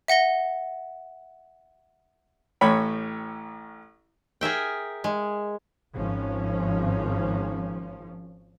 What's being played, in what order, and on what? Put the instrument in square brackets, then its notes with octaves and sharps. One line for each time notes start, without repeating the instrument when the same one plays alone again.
[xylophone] E5 F#5 A#6 G7
[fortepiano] A1 A2 C#5 G5 B5
[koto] G#4 A#4 E5 G5
G#3
[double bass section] G#1 F3 C#4